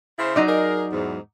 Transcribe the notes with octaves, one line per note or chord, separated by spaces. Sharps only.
C#3 E4 C5
F#3 D#4 D5
G#4 A#4
E2 G#2